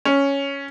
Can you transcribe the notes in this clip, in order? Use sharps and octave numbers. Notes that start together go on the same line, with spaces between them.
C#4